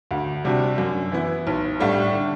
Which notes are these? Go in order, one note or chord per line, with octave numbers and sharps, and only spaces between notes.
D2
C3 G3 D4 F#4
F#2
E3 B3 E4
B1
A2 G3 D4
D3